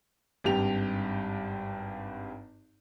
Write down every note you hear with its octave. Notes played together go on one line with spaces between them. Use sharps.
G#1 G2 G4 F7